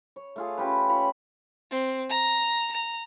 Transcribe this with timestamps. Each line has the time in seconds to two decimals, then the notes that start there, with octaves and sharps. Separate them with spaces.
0.16 C#5
0.36 A3 F4 G#4
0.58 C#4 F4 G4 B4
0.89 F4 C#5 B5
1.71 C4
2.09 A#5
2.72 A#5